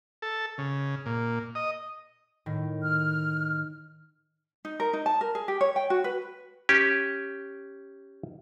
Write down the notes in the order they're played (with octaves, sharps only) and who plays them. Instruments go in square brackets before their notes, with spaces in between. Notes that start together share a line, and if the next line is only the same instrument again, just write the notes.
[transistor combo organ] A4
C#3
A#2
D#5
[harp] A2 D#3
[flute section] F6
[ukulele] D#4
A#4
D#4
A5
A#4
G#4
G4
C#5
G5
F#4
B4
[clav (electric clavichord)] C#4 G4